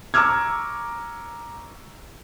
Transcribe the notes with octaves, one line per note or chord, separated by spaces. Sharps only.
A#5 C#6 D6 E6 F6 G#6